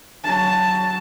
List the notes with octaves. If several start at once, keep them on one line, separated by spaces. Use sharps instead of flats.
F#3 A5